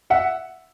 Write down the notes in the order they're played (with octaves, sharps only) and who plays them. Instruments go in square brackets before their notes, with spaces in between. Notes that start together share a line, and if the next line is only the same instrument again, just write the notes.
[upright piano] E5 F#5